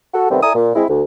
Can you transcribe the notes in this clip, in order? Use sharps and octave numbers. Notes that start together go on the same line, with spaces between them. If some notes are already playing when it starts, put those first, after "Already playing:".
F#4 A4
C3 D#3 G3 A3 B3 C4
E4 A4 D5 G#5 A#5 D#6
A#2
G#3 C4 E4
D2